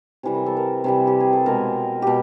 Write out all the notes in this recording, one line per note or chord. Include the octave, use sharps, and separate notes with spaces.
C3 E3 G3
A#4
A4
A#4
C3 E3 G3
G4
G#4
A4
B2 G#3 A#4
B2 G4